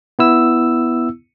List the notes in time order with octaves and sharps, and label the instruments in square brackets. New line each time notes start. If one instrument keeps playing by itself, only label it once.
[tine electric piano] B3 E4 E6